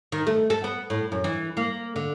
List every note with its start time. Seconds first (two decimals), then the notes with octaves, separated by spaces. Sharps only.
0.12 D#3
0.27 A3
0.50 A4
0.64 B3
0.90 A2
1.12 F#2
1.24 E3
1.57 A#3
1.96 D3